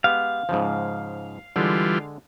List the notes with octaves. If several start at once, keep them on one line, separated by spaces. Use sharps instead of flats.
G#3 B3 G4 F5
G#2 C#3 F3
D3 E3 G3 G#3 F4